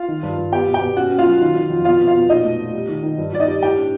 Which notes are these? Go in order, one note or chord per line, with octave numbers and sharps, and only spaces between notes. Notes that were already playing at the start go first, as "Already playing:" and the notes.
Already playing: F4 F5
D#3
G2
G2
B3 G4 G5
B2
G4 G5
B2
C#4 F#4 F#5
C#4
F4 F5
F#3
D#3
D#3
F2
B2 F4 F5
B2
F4 F5
B2
A#2 D#4 D#5
A3
A3
G3
D#3
D#3
G2
G2 D5
D#4 D#5
G3
A2 G4 G5
D4